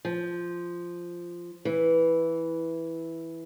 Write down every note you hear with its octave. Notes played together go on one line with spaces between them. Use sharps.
F3
E3